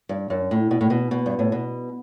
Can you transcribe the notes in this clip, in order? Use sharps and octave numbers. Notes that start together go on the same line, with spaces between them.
G2
F#2
A2
B2
A2
B2
B2
G2
A2
B2